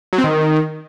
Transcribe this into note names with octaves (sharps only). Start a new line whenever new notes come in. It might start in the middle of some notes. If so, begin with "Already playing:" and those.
F#3
C4
D#3